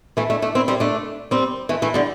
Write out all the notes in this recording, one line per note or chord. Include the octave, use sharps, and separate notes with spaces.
E3 A3
A3 D4
A3 D4
C4 E4
G3 C4
A3 D4
G3 C4
E3 A3
E3 A3
D3 G3